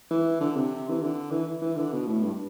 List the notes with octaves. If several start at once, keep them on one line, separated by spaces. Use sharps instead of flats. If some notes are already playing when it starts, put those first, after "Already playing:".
E3
D3
C3
E3
D3
E3
E3
D3
B2
A2
G2